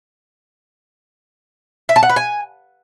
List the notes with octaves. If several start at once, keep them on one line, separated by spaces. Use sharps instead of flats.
E5
A5
F#5
B4
G#5